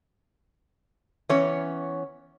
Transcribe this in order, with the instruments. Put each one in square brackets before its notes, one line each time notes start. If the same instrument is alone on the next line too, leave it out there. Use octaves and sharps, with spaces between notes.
[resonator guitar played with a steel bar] E3 B3 C#4 C#5